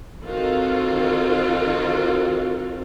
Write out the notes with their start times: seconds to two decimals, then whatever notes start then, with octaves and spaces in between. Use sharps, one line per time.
0.24 D#3 C4 F4 F#4 A4